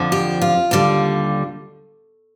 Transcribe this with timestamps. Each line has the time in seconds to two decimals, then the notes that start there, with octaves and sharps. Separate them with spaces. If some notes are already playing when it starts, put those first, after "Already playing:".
Already playing: F2 D3 F3
0.12 G4
0.42 F4
0.71 D#2 D3 G3